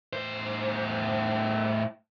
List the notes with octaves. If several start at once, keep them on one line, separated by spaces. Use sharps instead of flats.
A2 C5